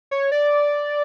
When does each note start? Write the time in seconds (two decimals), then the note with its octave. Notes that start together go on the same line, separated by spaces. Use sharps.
0.11 C#5
0.32 D5